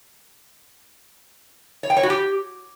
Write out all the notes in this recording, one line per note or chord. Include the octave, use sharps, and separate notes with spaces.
C#5
G5
C#5
F#4
G4